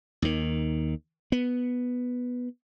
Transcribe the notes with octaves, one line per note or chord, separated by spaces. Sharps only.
D#2 D#3
B3